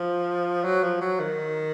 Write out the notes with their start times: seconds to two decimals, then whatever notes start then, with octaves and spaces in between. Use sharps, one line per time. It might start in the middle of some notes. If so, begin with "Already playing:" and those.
Already playing: F3
0.65 F#3
0.84 F3
1.01 F#3
1.20 D#3